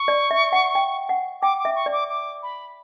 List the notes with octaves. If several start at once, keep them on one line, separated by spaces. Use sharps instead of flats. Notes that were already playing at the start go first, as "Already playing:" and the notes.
Already playing: C#6
D5
E5
F#5
G5
F#5
G5 D6
D6
E5
C#6
D5
D6
D6
B5